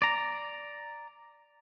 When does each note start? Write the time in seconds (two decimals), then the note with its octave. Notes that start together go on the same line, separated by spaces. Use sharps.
0.02 D5 A#5